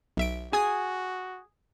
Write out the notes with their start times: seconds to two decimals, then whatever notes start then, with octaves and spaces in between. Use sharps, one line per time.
0.17 B1 E5 D7
0.53 F#4 G#4 G#5 D#6 G#6